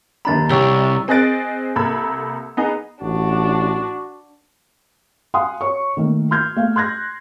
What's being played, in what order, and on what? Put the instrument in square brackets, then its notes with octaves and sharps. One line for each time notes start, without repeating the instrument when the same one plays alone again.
[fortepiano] D#2 D4 B5 [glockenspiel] A#5 A6
[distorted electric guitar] C2 [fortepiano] G3 C#4 G4 [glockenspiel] C#6 E6 G7
[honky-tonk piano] C4 G#4 D#5 F#6 A6 D7
C2 A#3 A4 B5 E6 G#6
B3 D#4 G#4
[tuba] A1 [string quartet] D4 [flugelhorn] F#4
[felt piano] F5 F#5 G#5 C6 D#6
C#5 C#6
D#3 A3 A#3
C6 F6 G6 G#6
A3 F5
C6 F#6 G#6 A#6